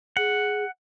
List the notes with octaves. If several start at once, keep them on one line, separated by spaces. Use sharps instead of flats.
G#4 F#5